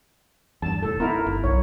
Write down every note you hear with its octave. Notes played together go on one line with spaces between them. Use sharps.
E2 G2 A5
F1 A2 A4
B3 D#4 E4 A#4
G1
B1 C#5